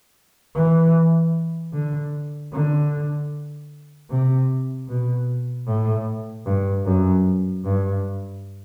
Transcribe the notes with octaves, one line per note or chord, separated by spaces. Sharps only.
E3
D3
D3
C3
B2
A2
G2
F#2
G2